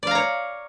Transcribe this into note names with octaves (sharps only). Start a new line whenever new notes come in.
C#5 D5 F5 A#5